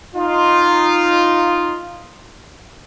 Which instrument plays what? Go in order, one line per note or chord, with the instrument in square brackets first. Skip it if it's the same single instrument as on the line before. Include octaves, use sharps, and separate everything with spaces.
[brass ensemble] D#4 F4